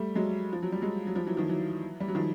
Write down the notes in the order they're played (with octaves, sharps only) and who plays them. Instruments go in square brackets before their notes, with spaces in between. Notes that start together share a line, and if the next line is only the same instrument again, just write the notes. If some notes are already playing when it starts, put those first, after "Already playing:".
Already playing: [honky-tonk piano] G3 A3
F#3 G#3
F3
F#3
G3
F#3 G#3
F#3
F3 G3
E3 F#3
D#3 F3
E3 F#3
G3
F#3
D#3 F3